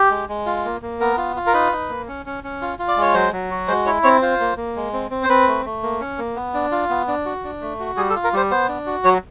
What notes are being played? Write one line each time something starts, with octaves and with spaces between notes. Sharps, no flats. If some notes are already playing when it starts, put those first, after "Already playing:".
Already playing: G4
G#3
G#3
F4
A#3
A#3
B3 A#4
F4
F4
A#4
D#4 B4
D#4
A#3
C#4
C#4
C#4
F4
F4
D5
G#3 C#5
F#3 C5
F#3
F#4
G#3 C5
E4 C#5
C4 C#5
F4 C5
A#3
A#3
G#3
C4
C4
C5
C4 B4
A3
A3
A#3
C#4
A#3
B3
D4
F4
B3
D4
F#4
D4
A3
F#4
G3 G#4
A4
F4
A#4
G3 C5
B3 C5
D4
F#4
F#3 C#5